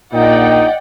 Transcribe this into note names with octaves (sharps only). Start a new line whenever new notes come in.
A#1 A#2 D#4 D5 D#5 F#5 G5